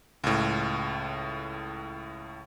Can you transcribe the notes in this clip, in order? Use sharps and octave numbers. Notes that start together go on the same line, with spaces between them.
C#2 A2